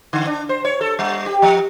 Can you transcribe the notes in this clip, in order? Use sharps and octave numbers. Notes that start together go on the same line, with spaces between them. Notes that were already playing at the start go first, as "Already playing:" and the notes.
D3
D4
C5
C#5
A4
G3
G4
F3